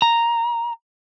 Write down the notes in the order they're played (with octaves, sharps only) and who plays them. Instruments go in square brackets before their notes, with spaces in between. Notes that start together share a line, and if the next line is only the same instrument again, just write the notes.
[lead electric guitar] A#5